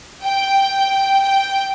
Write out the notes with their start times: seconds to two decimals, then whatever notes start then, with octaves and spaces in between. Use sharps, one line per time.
0.23 G5
1.23 G5